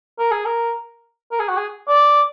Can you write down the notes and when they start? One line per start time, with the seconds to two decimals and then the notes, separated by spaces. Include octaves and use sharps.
0.19 A#4
0.31 G#4
0.45 A#4
1.32 A#4
1.40 G#4
1.49 F#4
1.57 G#4
1.88 D5